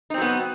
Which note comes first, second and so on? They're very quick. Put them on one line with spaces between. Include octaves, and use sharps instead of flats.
D#4 C4 F#3 B3